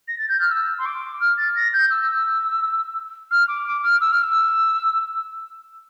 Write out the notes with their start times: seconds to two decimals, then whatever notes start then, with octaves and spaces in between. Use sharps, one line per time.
0.07 A#6
0.18 A6
0.28 G6
0.40 F6
0.50 E6
0.78 C6
0.85 D6
1.20 F6
1.37 A6
1.55 A#6
1.73 G6
1.90 E6
3.31 F6
3.48 D6
3.66 D6
3.83 F6
4.01 E6
4.12 F6
4.22 E6